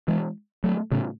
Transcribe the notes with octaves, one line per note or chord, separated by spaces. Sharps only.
E3 G#3
F#3 A3
A2 C#3